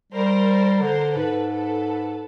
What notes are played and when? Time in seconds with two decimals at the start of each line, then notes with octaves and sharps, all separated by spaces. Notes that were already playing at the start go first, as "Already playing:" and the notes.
0.12 G3 A#4 C5
0.82 D3 A#4 C5
1.16 G#2 A4 B4
1.50 A4 B4